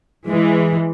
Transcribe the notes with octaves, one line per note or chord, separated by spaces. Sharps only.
E3 G#3